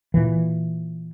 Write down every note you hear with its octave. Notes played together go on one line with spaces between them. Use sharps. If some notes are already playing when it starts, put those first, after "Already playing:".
A#2 E3